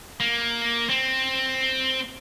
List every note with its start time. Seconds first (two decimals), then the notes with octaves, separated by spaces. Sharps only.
0.20 A#3
0.89 C4